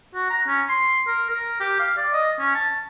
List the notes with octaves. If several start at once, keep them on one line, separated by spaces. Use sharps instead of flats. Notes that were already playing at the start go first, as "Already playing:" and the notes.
F#4
A#5
C#4
C6
A#4
A#4
G4
F5
D5
D#5
C#4
A5